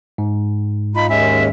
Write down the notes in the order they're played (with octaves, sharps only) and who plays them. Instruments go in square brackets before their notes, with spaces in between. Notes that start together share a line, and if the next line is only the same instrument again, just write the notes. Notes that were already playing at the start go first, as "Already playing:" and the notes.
[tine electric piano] G#2
[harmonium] D#4 F4 [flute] B5
[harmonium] D#2 G#3 C#4 [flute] E5